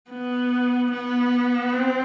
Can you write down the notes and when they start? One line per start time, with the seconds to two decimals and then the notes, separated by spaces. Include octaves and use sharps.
0.10 B3
0.91 B3
1.73 C4